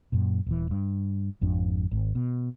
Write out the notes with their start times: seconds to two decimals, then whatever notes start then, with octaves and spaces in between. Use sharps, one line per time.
0.12 F#2 A#2
0.46 D#1 E3
0.71 G2
1.41 G#1 F2 D4
1.91 G#1
2.15 B2